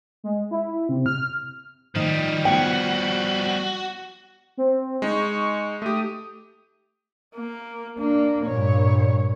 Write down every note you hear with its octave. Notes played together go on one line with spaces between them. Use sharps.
G#3
E4
C3
F6
D#3 F3 G3 D#4
B3 F#4 C#5 G5
C4
G#3 D#4 C#6
A3 G4 D#6
A#3
A#3 D4
G2 A#2 C#5